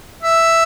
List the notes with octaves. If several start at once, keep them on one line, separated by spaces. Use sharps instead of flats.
E5